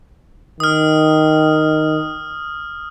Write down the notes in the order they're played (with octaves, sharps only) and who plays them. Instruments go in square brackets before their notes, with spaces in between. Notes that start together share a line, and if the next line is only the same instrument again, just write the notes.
[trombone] D#3 [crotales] D#6 F6